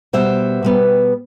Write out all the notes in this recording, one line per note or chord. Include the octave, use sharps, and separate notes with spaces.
B2 G3 B3 C5 E5
B2 G3 B3